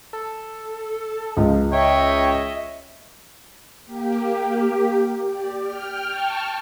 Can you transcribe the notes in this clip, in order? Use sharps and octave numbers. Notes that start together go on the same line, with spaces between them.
A4
C#2 F3
C#5 D#5 E5 G5
A#3 G4
G4 D5
G5 F6
G5 A5 C#6 F6